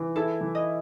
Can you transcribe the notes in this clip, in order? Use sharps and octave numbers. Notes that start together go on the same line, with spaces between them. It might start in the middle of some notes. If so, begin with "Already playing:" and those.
Already playing: E3
E4 A4
E3
D#5